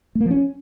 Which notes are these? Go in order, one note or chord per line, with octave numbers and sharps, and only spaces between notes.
A3
A#3
F3
C#4